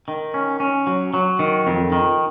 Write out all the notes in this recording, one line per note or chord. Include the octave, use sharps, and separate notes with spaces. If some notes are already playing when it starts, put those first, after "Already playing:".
D#3
C#4
C#4
F#3
F#3
D#3
F2
D#3